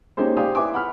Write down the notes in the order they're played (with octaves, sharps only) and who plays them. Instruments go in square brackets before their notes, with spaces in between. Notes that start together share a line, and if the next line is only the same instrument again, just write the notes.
[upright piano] A#3 C#4 D#4 G4 G#4 C5
G4 C5 D5 F5 G#5 D#6
E4 B4 G#5 D6
F#5 B5 F6